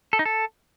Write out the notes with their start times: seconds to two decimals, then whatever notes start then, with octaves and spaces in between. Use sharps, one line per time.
0.13 A4
0.19 D#4
0.25 A4